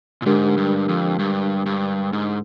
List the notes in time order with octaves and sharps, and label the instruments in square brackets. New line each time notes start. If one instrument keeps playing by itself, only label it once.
[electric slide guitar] A#2
[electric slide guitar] G#2 [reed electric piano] D3 G#3 D4 G4 A#4
[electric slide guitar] G2
F2
G2
G2
G#2